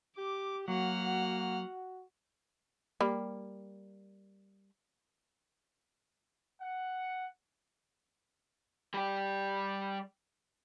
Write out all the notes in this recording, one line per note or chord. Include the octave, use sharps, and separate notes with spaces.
G4 D6
F#3 A#3 F#4 F#5 F6
G3 A#3
F#5
G3 G4